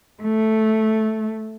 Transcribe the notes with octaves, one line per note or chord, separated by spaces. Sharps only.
A3